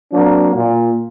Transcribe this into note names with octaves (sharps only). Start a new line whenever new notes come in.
F#3 A#3 C4 D4
A#2